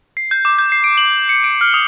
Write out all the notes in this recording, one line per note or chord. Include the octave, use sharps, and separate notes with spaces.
C7
G6
D6
G6
C7
D7
F#7
C#7
D7
F6
D#6